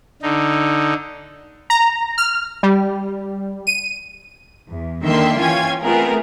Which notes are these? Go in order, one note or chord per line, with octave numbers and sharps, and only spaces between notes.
D3 D#4
A#5
F6
G3
D#7
E2
D3 D#3 A#3 E5 G5 C6
E3 C#4 F4 G5 G#5 G#6
A3 B3 C4 F4 G#4 A#4